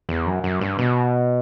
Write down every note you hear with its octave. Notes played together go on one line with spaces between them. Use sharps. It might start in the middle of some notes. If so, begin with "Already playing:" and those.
E2
F#2
F#2
G2
B2